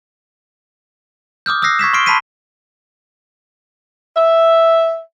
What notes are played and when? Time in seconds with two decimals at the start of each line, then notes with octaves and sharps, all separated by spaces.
1.46 D6 D#6 F6 G6
1.62 D#6 E6 F#6 A#6 C7
1.79 C#6 G#6 B6 E7
1.93 C6 C#6 F6 C7 D7 G7
2.06 A5 B5 C6 B6 C7 D#7
4.17 E5